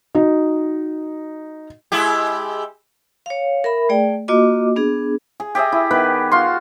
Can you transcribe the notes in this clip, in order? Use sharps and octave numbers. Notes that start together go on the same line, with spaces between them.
D#4 F#4 D#5
G#3 E4 G4
C#5 F5
A#4 E5 B5
A3 G#4 D5 G5
A#3 F4 F#4 D#5 D6
B3 D4 G#4
G#4
G4 G#4 D#5 E5
E4
D#3 B3 B4
F4 F#4 C6